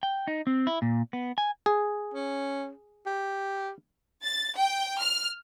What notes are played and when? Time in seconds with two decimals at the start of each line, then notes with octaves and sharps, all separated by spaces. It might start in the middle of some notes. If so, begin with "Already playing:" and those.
0.03 G5
0.27 D#4
0.47 C4
0.67 E4
0.82 A#2
1.13 B3
1.38 G#5
1.66 G#4
2.14 C#4
3.07 G4
4.24 A6
4.56 G5
5.00 F6